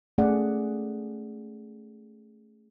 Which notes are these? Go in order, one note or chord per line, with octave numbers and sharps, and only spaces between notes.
A3 C#4 G#4 D5 F#5